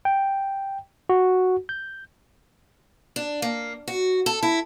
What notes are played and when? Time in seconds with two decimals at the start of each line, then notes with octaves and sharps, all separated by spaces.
0.05 G5
1.09 F#4
1.69 G6
3.16 D4
3.42 A#3
3.88 F#4
4.26 A4
4.43 E4